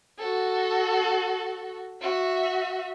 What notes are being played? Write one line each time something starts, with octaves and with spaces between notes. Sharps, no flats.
F#4 A4
F#4 E5